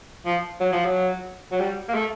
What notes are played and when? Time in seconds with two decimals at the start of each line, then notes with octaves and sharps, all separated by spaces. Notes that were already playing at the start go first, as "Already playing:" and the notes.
0.25 F3
0.60 F#3
0.72 F3
0.85 F#3
1.52 F#3
1.59 G3
1.88 A#3
1.94 A3